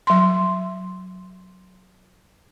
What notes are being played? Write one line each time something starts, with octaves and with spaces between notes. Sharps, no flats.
F#3 C6